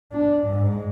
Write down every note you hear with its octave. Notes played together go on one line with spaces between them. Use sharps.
D4
G#2